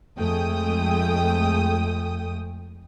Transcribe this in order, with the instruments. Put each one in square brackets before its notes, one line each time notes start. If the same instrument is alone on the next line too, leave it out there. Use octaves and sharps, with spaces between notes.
[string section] F2 G#3 A3 G5 D#6